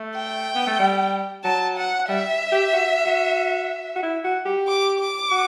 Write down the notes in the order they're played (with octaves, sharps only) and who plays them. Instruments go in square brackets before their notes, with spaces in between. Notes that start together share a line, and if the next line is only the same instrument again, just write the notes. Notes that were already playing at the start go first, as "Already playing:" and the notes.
Already playing: [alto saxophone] A3
[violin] G5
[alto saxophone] B3
A3
G3
[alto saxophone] F#3 [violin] A5
[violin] F#5
[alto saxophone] G3 [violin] E5
[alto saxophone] G4
F#4
F#4
F#4
E4
F#4
G4
[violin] D6
D6
[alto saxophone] F#4